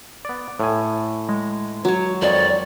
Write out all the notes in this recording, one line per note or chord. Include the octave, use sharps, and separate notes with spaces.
B3 D5
A2 G#5
G#3
F#3 C#5
F2 D#3 C#5 D5